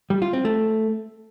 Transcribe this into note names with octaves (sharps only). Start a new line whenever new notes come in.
G3
F4
C4
A3